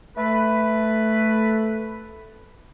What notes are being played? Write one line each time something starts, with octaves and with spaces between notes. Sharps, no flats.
A3 B4